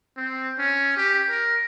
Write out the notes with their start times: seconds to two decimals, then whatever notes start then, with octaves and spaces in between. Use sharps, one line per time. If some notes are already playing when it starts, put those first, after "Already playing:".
0.17 C4
0.59 C#4
0.97 G4
1.30 A#4